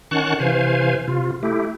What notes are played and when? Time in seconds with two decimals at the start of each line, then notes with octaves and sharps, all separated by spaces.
0.11 D#3 C#4 F#5 A5 C#6 F#6
0.40 C3 E3 C5 F5 G#5
1.08 C3 F4
1.43 A3 E4 G4